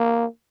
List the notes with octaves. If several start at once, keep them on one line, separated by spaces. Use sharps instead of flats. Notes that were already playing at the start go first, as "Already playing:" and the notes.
Already playing: A#3